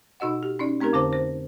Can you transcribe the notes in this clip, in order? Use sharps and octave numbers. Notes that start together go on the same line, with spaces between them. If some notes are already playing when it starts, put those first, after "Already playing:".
B2 D#4 F#4 D#5 F#5
G4
C#4 D#4 D5
A3 C4 D#4 G4 A#4
F2 D3 C5 A5 D6
C5